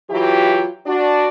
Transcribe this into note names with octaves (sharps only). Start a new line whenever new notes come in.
E3 F#3 E4 F4 G4
D4 F#4 D5